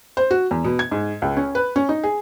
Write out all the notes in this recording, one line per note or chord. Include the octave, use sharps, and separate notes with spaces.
C5
F#4
E2
B2
G#6
G#2
C#2
C#4
B4
C#4
D#4
G#4